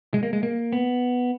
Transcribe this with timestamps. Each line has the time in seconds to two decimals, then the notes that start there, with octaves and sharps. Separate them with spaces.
0.14 G#3
0.23 A#3
0.33 G#3
0.43 A#3
0.73 B3